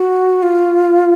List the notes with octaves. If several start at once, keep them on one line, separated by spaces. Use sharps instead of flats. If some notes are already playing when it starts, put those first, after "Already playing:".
Already playing: F#4
F4